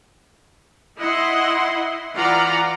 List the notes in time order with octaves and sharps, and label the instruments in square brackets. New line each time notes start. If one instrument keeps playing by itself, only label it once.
[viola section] E4 D#5 F#5 C6
E3 F4 D5 F5 F#5 A#5